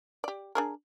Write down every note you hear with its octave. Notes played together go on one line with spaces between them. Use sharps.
G4 D5
D4 G#4 A#4